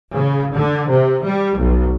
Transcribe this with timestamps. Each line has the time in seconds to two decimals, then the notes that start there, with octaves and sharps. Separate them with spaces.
0.14 C#3
0.55 D3
0.90 C3
1.25 G3
1.59 B1